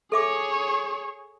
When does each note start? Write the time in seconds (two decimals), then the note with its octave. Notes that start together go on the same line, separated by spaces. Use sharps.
0.12 G#4 A4 C#5 E5 D6